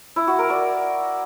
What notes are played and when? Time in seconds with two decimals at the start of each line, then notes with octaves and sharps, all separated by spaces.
0.16 E4
0.27 F#4
0.39 A#4
0.50 D5